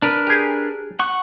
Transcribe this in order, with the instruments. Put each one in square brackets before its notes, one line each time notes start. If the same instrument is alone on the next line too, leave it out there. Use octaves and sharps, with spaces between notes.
[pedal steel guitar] D4 A#4 B4
[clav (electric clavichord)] G4 G#4
[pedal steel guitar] F#5 C#6